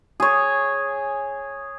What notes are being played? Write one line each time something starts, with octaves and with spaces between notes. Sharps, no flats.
G#4 C#5